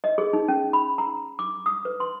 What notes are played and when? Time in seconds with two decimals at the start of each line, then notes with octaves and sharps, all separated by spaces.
0.04 D#5
0.18 G#4
0.33 D#4
0.48 C#4
0.73 B5
0.98 A#5
1.39 D6
1.66 D#6
1.85 B4
2.00 C6